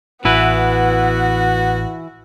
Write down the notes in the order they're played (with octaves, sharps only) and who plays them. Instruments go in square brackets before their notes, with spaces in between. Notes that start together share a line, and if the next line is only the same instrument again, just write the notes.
[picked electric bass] A1 [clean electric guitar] E3 E4 B4 [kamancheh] B3 [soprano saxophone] F#4